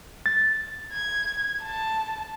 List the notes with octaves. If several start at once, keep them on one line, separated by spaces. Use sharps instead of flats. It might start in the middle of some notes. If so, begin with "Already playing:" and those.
A6
G#6
A5